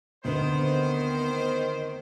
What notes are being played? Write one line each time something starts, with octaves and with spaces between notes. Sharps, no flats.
D2 D3 D#3 B3 C4 C5